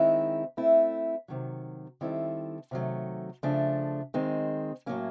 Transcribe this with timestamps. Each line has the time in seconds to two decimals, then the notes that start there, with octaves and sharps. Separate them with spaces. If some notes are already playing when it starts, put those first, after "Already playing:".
Already playing: D#3 G#3 C4 E4
0.57 A3 C4 E4
1.28 C3 D#3 F#3
2.01 D#3 G3 C4 E4 A4
2.71 C3 D#3 F#3 A3
3.43 C#3 F3 A3 D4
4.14 D#3 G#3 C4
4.86 A2 F#3 A#3 C#4